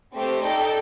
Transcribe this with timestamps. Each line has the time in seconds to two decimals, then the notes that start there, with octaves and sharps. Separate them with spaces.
0.13 A3 C4 G4 C5
0.42 D#4 A4 D5 G5